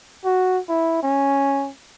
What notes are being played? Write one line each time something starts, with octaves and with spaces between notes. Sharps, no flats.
F#4
E4
C#4